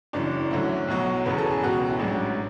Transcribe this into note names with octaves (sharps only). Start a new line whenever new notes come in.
F#1 F#2 E3 D4
D2 D3 F#3 E4
B1 B2 F#3 F#4
E1 E2 C#3 F#3 B4
A4
G#4
C#2 B2 F#3 F#4
E4
A1 G#2 F#3 D4